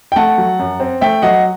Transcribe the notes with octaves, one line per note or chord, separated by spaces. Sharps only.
G5
A3 F#5 A5
F#3
F#2
C4
A3 E5 G5
F#3 D#5 F#5